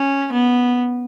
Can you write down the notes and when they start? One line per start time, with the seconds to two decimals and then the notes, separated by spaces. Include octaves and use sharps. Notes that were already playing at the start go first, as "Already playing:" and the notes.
Already playing: C#4
0.33 B3